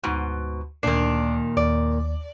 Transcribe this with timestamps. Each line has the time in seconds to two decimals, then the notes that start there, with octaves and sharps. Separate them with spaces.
0.04 D2 G#2 B2 F#4
0.83 D2 A#2 D#3 D4 C7
1.57 D#2 D5